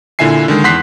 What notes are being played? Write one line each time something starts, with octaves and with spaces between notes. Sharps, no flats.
A#2 D3 E4 E5 G#5 C7
D3 D#3 G#3
E2 F#5 C6 F#6 B6 C7